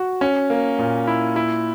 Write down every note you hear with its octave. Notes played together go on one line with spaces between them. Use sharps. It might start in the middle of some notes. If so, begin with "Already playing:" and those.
Already playing: F#4
C#4
A#3
A#2
E4
E4